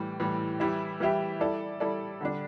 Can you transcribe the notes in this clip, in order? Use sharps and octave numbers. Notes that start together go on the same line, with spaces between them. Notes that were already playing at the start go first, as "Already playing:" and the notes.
Already playing: A2 E3 G3
A2 E3 G3
E3 G3 E4 G4 E5
E3 G3 E4 G4 E5
G3 E4 A4 D5
G3 E4 A4 D5
D3 G3 D4